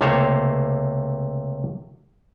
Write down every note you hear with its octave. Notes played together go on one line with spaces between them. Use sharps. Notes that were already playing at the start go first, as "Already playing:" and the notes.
C#2 C3 A3 A#3 C5 C#5